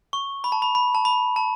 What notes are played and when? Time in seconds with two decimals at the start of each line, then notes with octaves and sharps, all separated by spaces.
0.13 C#6
0.44 B5
0.52 A5
0.62 B5
0.75 B5
0.95 A5
1.05 B5
1.36 A5